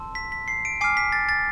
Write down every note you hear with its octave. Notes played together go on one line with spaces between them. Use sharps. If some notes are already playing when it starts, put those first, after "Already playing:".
Already playing: A5 C6 E6
B6
B6
C7
D7
G#5 D6 F6 C7
B6
A6
A6